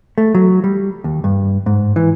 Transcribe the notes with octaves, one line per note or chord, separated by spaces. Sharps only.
A3
F#3
G3
D#2
G2
G#2
E3